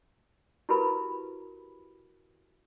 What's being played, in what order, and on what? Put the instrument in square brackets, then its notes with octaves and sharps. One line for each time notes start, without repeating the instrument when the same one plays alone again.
[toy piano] E4 F#4 G4 A#4 B4 B5